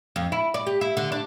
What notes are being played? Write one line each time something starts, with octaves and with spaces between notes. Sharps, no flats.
F2
E4
D5
G4
E4
D3
D4